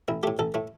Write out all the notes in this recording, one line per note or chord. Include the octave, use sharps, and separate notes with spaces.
A1 E4
A2 A3 G4
A1 A4
A2 A3